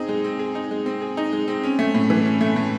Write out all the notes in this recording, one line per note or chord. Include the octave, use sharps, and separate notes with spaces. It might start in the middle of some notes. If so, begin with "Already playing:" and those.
Already playing: C4 D#4 G#4
G#3
C4
G#4
D#4
G#3
C4
G#4
D#4
G#3
C4
C#4
A3
A2
E3
C#4
A3
A2